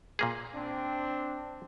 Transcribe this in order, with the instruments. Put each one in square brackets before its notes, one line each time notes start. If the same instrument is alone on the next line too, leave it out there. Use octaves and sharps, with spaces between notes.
[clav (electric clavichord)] A#2 A#3 G#4
[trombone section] C4 D4